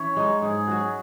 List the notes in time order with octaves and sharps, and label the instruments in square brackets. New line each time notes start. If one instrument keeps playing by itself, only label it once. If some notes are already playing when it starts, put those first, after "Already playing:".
Already playing: [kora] E3 C#4 [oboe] C#5
[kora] G#3 D#4
[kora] G#2 [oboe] G#4
[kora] F#3 C#4 F#4